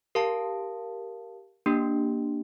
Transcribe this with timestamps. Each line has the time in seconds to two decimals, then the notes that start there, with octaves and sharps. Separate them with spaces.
0.15 G4 A#4 F5 A5
1.66 A#3 D4 G4